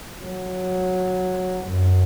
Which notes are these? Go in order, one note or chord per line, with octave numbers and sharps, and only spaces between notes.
F#3
F#2